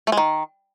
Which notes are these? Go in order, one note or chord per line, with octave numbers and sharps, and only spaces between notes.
A3
G#3
D#3